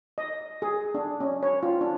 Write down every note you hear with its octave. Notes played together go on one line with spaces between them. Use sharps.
D#5
G#4
D4
C#4
C#5
F4
D4